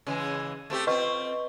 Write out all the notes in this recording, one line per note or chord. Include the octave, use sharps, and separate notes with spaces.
C#3 E3 G#3
A3 C4 G4
C4 F4 B4 D#5 C#6